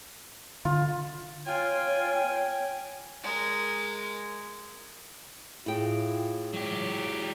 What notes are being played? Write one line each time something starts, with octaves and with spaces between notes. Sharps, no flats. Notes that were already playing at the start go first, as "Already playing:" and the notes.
D3 F4
F4 C#5 G5 G#5
G#3 A#4
A2 E4 F4 G#4 G5
F#3 G4